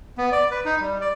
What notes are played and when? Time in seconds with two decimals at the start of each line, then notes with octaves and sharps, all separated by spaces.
0.18 B3
0.32 D5
0.51 B4
0.65 D#4
0.80 G3
1.01 D5